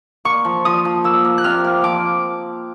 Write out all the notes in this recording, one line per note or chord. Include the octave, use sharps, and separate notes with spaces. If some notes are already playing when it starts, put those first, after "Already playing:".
A#3 C#6
F3
F3 D#6
F3
A#3 E6
A#3
F#6
C3 F6
A#3
F3 D6